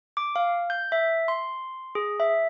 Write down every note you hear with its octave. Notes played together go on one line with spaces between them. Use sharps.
D6
F5
G6
E5
C6
G#4
E5